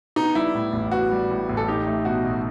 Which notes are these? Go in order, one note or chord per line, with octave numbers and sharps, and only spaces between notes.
B3 D#4
G3 E4
A2
A1
B3 F#4
G3
A2
A1
A4
D#4 G4
A3
B2 F#4
B1